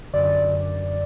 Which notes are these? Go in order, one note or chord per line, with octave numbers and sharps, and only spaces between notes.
F#2 D3 D5